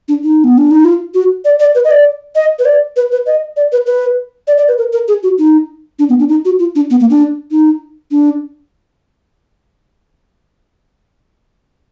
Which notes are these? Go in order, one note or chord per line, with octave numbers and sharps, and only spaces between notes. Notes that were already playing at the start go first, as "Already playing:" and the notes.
D4
D#4
B3
D4
D#4
F4
F#4
D5
D5
B4
D#5
D5
D#5
B4
D5
B4
B4
D#5
D5
B4
B4
D5
D5
B4
A#4
A#4
G#4
F#4
D#4
D4
B3
D4
D#4
F#4
F4
D4
B3
A#3
D4
D#4
D4